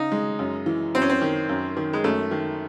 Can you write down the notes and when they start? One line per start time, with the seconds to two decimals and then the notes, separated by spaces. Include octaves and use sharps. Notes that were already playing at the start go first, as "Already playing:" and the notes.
Already playing: C#3 D#4
0.12 G#3
0.39 F#2
0.66 E3
0.95 F#2 C4
1.02 C#4
1.10 C4
1.21 D#3
1.49 F#2
1.77 D#3
1.93 G#3
2.04 F#2 A3
2.31 D#3